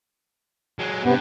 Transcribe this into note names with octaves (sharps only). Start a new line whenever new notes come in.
F#3 G#3
G2 C3 B3